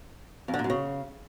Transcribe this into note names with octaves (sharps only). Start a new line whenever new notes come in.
F2
D3
A#2
F#2
C#3